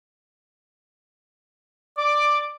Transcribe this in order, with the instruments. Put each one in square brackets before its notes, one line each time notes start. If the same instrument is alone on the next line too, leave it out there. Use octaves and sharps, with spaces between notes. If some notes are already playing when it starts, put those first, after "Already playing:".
[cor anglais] D5 [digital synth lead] D6